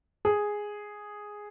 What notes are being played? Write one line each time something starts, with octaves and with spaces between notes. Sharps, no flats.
G#4